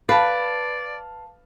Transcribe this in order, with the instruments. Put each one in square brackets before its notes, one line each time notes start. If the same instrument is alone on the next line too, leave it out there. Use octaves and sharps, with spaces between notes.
[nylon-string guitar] B4 [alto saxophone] D5 [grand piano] F5 A5